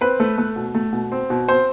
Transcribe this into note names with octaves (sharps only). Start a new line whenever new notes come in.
C4 B4
A3
A3
B2
A3
B2
C4
B2
C4 C5